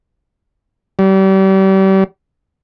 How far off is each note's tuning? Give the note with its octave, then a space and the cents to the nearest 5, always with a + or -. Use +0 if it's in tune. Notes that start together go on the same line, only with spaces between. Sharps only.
G3 -35